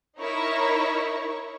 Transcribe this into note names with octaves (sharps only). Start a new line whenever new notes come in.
D#4 E4 A#4 C#5 C#6